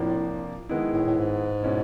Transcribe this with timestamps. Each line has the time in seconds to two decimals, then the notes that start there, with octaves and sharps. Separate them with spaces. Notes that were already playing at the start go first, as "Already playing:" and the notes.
Already playing: A2 C3 F3 A#3 D4
0.69 D#3 G#3 B3 E4
0.93 A2
1.06 A2
1.17 G#2
1.63 B2 G#3 C#4 E4